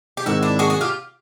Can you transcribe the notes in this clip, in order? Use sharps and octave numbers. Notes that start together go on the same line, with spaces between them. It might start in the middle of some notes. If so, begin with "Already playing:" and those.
G4
G#2 D#3 G#3 C4 D#4 E4 F#4
D4 E4
F#4 G#4
F#4 G#4
F4 G4